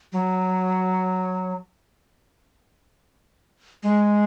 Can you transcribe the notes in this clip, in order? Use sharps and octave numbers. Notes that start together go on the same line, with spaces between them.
F#3
G#3